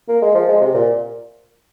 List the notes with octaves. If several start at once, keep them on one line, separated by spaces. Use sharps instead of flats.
A#3
G#3
F3
G#3
C3
A#2